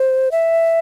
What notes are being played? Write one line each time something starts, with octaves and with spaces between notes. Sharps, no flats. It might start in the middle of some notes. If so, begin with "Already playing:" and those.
Already playing: C5
E5